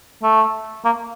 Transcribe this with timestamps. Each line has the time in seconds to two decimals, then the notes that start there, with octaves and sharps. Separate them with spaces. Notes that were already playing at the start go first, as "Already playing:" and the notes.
0.23 A3
0.85 A#3